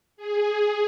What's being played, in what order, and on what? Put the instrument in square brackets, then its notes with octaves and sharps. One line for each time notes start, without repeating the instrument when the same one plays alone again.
[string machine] G#4